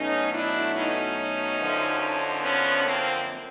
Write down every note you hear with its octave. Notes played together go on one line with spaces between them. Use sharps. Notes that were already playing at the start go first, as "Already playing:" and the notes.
Already playing: B2 F#3 A3 C#4 D#4
D4 E4
C#4 D#4
F#2 D3 F3
B3 C#4
A#3 C4